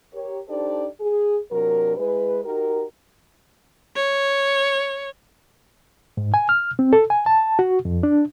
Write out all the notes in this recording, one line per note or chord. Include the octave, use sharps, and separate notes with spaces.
G4 A#4 C#5
D4 D#4 G4 A4 C5 D5
G#4
C3 F#3 D4 A#4
G#3 E4 G#4 B4
D#4 F#4 G4 A#4
C#5
G#2
G#5
F6
C4
A4
G#5
A5
F#4
F2
D4